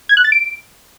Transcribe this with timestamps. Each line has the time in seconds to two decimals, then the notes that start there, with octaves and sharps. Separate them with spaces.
0.09 G#6
0.17 F#6
0.24 A6
0.32 D7